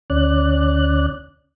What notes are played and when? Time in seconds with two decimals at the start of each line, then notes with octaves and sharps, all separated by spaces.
0.10 D2 C#4 D5 F#6